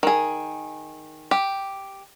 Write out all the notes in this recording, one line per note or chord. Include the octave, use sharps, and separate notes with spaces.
D#3 G#4
G4